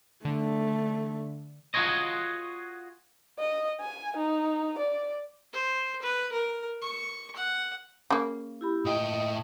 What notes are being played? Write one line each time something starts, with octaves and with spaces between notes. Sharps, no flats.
D3 A3
F4 F#4 G#4 C#5 D#5
D#5
G#5
D#4
D5
C5
B4
A#4
C#6
F#5
C#3 A#3
E4 G4 B5
A2 D#5 G5 D#6